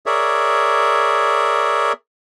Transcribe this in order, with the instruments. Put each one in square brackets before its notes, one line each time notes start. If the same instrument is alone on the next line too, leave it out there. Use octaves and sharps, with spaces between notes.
[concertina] G#4 A#4 C#5 D5 E5